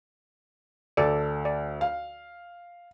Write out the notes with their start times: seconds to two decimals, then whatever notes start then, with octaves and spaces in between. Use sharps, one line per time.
0.97 D2 A4 D5
1.45 D5
1.81 F5